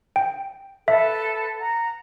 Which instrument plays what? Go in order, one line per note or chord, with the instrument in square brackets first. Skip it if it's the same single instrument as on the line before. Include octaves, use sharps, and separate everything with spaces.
[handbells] G5
[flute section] A4 B4 [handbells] E5
[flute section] F#5 A#5